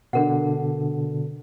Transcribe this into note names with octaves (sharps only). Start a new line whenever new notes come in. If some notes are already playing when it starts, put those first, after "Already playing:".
B2 D3 D4 A#4 F#5